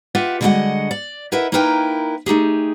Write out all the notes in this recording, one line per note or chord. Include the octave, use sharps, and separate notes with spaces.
F4 G4 B4 E5 F#5
D3 G3 G#3 F#4 D#5 F#5
D5
E4 A#4 B4 D#5 E5 F#5
A#3 D#4 E4 A#4 B4 G5
A3 D#4 G4 G#4